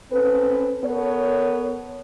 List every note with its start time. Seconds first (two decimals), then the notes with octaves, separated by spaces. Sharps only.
0.12 C4 C#4 A4 B4
0.84 B3 A4 A#4 C#5